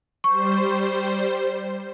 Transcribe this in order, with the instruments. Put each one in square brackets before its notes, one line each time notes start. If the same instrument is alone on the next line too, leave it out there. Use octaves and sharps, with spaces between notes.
[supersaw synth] G3 C5 [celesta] C#6